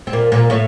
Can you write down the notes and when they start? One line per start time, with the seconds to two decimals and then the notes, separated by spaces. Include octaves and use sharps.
0.07 C4
0.13 A#2 A#3
0.32 A#2 A#3
0.50 A2 A3